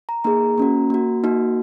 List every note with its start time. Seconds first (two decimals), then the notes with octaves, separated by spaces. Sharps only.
0.09 A#5
0.24 A#3 D#4 G#4 A#5
0.58 A#3 C#4 F#4
0.90 A#3 F#4
1.24 A#3 D#4 F#4